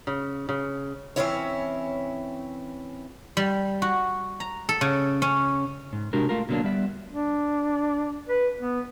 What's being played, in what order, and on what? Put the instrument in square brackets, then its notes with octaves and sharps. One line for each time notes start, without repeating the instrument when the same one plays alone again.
[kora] C#3
C#3
[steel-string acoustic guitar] E3 F3 C4 C#4 E4 C#5
[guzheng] G3
F#4
A#5
A4
C#3
C#4
[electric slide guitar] G#2
C3 G#3 D4 F#4 G4 A#4
A3 F4 A#4
B2 D3 F#3 A#3 D4
G3 B3 D5 E5
[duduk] D4
B4
B3